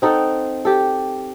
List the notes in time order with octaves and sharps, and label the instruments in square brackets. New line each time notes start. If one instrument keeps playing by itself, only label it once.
[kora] C4 D#4 A4 F#5
G4 A4